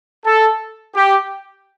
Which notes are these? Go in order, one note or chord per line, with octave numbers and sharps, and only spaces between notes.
A4
G4